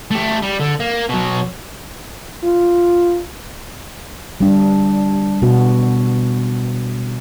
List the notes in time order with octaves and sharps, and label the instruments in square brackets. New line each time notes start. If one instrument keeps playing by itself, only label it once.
[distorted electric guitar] A3 G4
G3
D3
A#3
B2 F#3
[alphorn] F4
[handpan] G3 D4
B2 B3 F#4